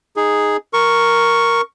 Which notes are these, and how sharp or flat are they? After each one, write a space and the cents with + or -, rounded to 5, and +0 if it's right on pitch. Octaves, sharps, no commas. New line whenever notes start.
D#4 +0 G#4 +0
A#4 +0 C#6 +0